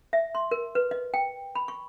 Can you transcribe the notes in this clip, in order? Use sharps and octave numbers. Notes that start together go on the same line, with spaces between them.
E5
C6
A#4
B4
D#5
G5
B5
C#6